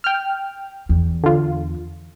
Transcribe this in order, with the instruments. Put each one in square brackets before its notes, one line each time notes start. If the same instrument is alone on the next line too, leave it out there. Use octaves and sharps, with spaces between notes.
[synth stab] G5 F6
[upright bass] E2
[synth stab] D3 F4